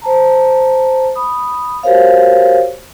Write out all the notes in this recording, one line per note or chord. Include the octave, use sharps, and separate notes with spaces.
C5 A5 A#5
B5 D#6
F#4 G4 A#4 C5 C#5 F5